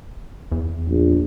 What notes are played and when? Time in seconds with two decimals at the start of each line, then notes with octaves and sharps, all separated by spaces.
0.52 E2
0.88 A#1